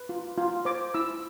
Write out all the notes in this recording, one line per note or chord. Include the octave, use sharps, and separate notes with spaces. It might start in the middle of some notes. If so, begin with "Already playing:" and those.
Already playing: B4
F4
F4
C5 D6
E4 E6